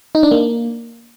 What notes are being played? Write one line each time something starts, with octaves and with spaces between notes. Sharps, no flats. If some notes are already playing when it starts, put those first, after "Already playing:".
D#4
D4
A#3